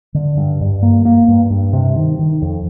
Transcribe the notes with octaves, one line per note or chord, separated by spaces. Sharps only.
D3
G2
G2
A#3
A#3
G2
G2
C3
D#3
D#3
F2